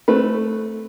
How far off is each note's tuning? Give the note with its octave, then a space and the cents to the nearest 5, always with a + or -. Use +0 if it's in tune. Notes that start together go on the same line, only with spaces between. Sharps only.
A3 +0 C4 +0 B4 +0